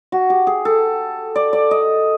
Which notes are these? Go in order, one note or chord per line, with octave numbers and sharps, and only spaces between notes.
F#4
G4
G#4
A4
D5
D5
D#5